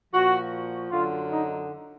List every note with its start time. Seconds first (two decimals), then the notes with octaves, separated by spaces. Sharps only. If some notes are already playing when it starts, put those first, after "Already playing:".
0.13 A#2 F3 F#4
0.91 F#2 D3 F#3 F4
1.31 D#4